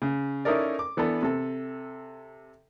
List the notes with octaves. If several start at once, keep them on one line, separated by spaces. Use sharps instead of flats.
C#3
C#4 D#4 E4 A4 A#4 D5
D6
E3 B3 D4 A4 B4
C3 A4